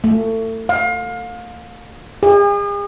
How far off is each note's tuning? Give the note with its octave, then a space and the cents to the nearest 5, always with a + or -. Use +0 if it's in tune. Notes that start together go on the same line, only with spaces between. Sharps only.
A3 +30
F5 +30
G#4 -40